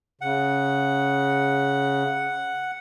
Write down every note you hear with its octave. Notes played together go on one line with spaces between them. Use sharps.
C#3 F#5